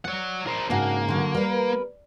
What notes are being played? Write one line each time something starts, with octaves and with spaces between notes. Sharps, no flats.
C#5 D5 F#5
A#4 C5
G#2 C#3 G#3 A#3 D4 F#4
D3 F#3
G3 A#4 B4